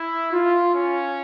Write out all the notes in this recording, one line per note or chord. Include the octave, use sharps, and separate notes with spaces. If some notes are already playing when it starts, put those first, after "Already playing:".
Already playing: E4
F4
C#4